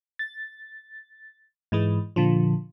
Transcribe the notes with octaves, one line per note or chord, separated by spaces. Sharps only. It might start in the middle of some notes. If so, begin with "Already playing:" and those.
A6
G#2 E3 G#3
A#2 D3 F3